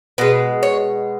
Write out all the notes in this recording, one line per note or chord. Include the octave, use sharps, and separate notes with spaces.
B2 G#3 B4
C#5